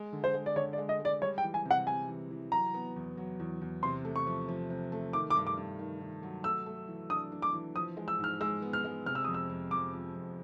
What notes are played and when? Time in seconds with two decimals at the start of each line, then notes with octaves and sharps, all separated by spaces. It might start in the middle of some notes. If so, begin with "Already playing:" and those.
Already playing: G#3
0.13 D3
0.24 C5
0.34 G#3
0.46 D5
0.56 D3 C#5
0.73 D5
0.78 G#3
0.89 D#5
1.00 G#3
1.05 D5
1.22 G3 C#5
1.38 G5
1.43 E3
1.54 G#5
1.65 C3
1.71 F#5
1.87 G3 G#5
2.09 E3
2.31 E3
2.52 F#3 A#5
2.74 B3
2.96 E2
3.17 F#3
3.39 E2
3.61 E2
3.83 C3 C6
4.05 A3
4.16 C#6
4.27 F3
4.48 F3
4.70 C3
4.92 A3
5.13 D#3 D6
5.30 D6
5.35 G2
5.47 D6
5.57 G2
5.79 D#3
6.01 D#3
6.23 F#3
6.44 A3 E6
6.66 A3
6.88 E3
7.10 D4 D#6
7.32 D4
7.42 D6
7.54 E3
7.75 F3 D#6
7.97 G#3
8.08 E6
8.19 G#2
8.24 F6
8.41 G#3 E6
8.62 B3
8.73 F6
8.84 G#3
9.06 C3 F6
9.15 E6
9.24 F2 D#6
9.34 E6
9.50 F2
9.71 F2 D6
9.93 F3
10.14 F2